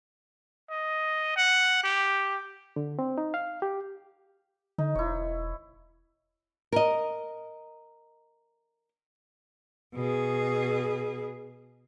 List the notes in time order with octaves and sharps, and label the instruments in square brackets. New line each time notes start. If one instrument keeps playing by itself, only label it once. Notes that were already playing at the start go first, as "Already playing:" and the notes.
[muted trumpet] D#5
F#5
G4
[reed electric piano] D3
C4
D#4
F5
G4
[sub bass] D3 [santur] D#4
[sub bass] E1 [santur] E4 C#5
[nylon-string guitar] A#4 D#5
[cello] B2 G#4